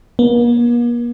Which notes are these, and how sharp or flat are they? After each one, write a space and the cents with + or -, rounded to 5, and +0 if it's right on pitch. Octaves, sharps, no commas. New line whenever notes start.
A#3 +45